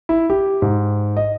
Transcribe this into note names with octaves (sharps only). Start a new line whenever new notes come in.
E4
G4
G#2
D#5